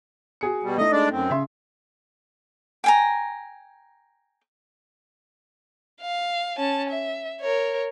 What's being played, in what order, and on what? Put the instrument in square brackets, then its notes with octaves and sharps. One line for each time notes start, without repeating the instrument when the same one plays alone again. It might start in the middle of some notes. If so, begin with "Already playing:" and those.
[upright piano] F#4 G#4 C#7
[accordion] B2 G3
[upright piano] A3 D#4 [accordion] D#5
[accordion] G#3 D4 D5
F#2 C4
[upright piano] C#3 E5 C6
[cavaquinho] G5 G#5 A#5
[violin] F5
C#4 A5
E5
A#4 C#5